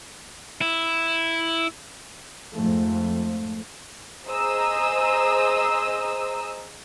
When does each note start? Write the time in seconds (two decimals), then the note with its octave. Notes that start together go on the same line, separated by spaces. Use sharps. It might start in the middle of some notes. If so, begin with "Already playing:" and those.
0.61 E4
2.54 F2 G#2 F3 A3
4.27 G#4 C5 D#5 A#5 D#6 E6